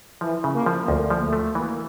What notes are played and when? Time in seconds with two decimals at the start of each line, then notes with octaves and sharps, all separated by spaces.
0.21 E3 F3
0.44 C#3
0.55 A#3
0.66 F3
0.88 D2 A#3
1.10 F3
1.22 A3
1.33 A3
1.55 E3 A#3